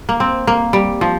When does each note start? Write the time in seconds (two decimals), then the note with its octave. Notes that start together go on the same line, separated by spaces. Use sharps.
0.09 A#3
0.20 C4
0.47 A#3
0.73 G3
1.01 F3